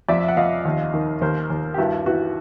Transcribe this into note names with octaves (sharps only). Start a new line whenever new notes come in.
F2 D5 E5
F#5
F2 D#5 F5
D#2
D#3
D#2 A#4 C5
D#2
G4
G2 E4 F#4
E3 E4 F#4